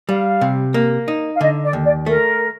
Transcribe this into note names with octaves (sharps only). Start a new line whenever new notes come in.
G3 F5
C3
A#3
D#4
F5
D3 D#5
D5
D#2
D5
A3 A#4